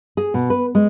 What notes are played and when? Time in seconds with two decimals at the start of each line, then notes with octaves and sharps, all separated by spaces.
0.17 G#4
0.34 B2
0.50 B4
0.75 G#3